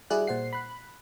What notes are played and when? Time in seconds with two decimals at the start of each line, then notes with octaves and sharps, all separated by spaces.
0.10 G3 E4 F#4 G#4 D5 F#6
0.27 A#2 C5 F#5 C7
0.53 B5 F#6